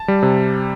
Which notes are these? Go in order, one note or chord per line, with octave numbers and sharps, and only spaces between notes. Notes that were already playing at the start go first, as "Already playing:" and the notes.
Already playing: A5
G3
C3